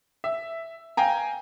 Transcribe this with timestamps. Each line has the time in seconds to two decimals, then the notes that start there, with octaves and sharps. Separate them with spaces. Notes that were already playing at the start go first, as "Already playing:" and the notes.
0.24 E5
0.97 F5 G5 G#5 A#5